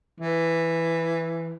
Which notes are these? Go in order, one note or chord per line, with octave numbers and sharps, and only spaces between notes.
E3